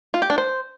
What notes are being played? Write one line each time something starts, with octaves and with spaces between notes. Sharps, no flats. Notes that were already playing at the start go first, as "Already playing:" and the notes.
F4
G4
D4
C5